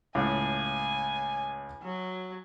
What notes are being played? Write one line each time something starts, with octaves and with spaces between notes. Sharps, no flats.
C#2 A2 G#5
F#3